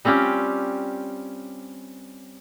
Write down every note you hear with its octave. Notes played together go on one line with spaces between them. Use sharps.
G3 C4 C#4 F4 G4